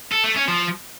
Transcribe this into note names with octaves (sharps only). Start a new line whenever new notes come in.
A4
A3
C#4
F3